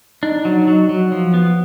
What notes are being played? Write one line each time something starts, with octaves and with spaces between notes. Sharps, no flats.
D4 D#4
F#3
F#3
F#3
F3
B3